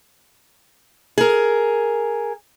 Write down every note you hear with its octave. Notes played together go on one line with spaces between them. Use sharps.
G#4 A#4